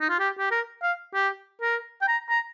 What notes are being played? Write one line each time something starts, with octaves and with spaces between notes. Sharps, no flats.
D#4
F4
G4
G4
A#4
F5
G4
A#4
G5
A#5
A#5